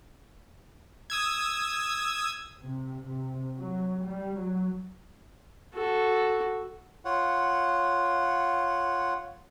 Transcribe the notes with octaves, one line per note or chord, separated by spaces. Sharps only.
D#6 E6 G#6
C3
C3
F#3
G3
F#3
F#4 A4
F4 C#5 F#5